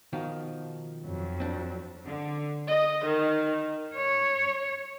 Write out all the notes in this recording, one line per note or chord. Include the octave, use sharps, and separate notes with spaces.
B2 D#3 F3
F2 F#3
C4 D4
D3
D#5
D#3
C#5